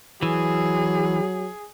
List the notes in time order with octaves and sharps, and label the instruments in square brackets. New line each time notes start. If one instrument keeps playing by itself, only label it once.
[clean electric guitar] E3 [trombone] F#3 [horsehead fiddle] G#4